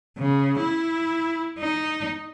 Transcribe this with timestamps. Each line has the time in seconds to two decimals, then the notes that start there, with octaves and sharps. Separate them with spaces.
0.18 C#3
0.60 E4
1.59 D#4